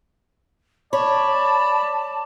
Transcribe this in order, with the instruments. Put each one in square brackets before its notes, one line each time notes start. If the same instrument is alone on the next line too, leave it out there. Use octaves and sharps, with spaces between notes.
[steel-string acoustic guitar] C#5 [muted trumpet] D5 [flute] A5 [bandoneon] B5